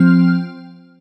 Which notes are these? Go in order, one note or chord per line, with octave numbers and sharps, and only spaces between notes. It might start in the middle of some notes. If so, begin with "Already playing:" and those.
Already playing: F3 C4 F6